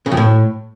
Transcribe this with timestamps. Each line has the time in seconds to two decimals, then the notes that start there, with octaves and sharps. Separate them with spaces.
0.06 C#3
0.12 F2
0.17 A2